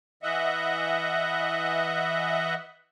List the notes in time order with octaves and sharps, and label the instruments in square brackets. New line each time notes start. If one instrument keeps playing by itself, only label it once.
[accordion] E3 D#5 E5 F#5